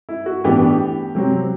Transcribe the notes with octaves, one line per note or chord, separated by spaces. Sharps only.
E4
F#4
A2 E3 B3 D4 G4
C3 F#3 C4